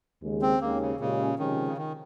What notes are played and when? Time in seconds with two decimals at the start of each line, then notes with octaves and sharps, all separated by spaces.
0.22 D#2 C#3 G#3
0.42 C4
0.61 D#2 D#3 G#3 A#3 C#4
0.81 C#3
1.00 A#2 C#3 G#3 C#4 G4
1.39 C3 D#3 F3 G#3 C#4
1.67 C#3
1.77 D#3